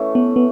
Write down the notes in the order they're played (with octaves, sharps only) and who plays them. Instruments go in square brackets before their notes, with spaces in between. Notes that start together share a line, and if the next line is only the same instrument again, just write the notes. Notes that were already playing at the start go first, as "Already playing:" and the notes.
Already playing: [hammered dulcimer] E3 A3 C#4
[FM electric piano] B3
B3